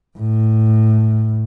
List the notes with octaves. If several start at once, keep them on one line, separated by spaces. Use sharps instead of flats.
A2